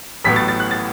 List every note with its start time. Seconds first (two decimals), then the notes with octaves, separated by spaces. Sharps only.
0.24 A1 A2 F#3 B3 B6
0.36 A6
0.48 A6
0.60 F#6
0.71 A6